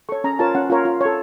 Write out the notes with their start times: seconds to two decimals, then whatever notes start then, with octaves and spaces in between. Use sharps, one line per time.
0.09 A4 C#5 C#6
0.24 C#4 A#5
0.39 F4 A#4 C#5 A5
0.55 C#4 F#5
0.70 F4 A#4 C#5
0.85 F4
1.01 A4 C#5